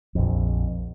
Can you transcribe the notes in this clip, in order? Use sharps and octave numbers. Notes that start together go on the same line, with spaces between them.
A#1 F2